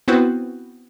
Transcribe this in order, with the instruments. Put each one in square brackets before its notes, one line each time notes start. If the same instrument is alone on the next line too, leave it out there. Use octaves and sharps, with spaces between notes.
[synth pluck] B3 C4 E4 F#4 B4 C5